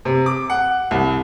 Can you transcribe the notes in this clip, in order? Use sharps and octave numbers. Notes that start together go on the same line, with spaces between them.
C3
D6
F#5
C2